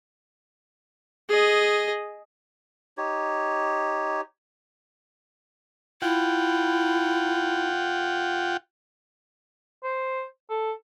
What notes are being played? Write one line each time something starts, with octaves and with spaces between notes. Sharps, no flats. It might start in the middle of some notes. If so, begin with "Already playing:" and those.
G#4 D#5
D#4 G4 C#5
E4 F4 F#5 G5
C5
A4